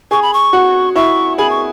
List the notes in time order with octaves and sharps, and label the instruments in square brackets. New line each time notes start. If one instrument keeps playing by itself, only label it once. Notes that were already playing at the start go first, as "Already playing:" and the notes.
[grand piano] G#4 G#5 [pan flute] C#6
[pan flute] B5
C#6
[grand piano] F#4 F#5
[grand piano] E4 E5 [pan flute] C#6
[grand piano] G#4 G#5 [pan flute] B5
[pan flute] C#6